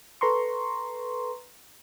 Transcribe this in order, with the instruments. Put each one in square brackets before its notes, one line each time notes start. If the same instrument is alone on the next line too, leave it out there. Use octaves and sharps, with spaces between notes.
[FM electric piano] A4 B4 A#5 C6 C#6